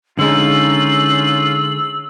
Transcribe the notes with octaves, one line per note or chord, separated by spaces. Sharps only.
D3 G#3 C#4 D#4 F4 E6 F#7